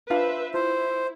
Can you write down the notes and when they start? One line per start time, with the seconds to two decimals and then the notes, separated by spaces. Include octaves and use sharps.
0.10 D4 F4 B4 C5 E5 F5
0.54 E4 F4 C5